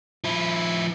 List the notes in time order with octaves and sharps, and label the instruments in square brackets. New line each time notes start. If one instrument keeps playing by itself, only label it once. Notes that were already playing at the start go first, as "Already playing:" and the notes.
[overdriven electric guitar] F3 E4